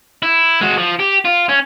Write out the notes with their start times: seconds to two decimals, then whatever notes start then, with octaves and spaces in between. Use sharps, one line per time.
0.23 E4
0.61 G#3 F#4
0.77 F3
0.99 G4
1.25 F4
1.49 C#4